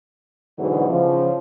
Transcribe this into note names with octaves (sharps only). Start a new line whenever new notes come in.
G#2 B2 D3 E3 F#3 B3
C#3 F3